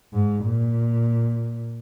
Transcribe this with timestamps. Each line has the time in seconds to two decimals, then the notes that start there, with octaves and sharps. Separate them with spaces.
0.13 G#2
0.45 A#2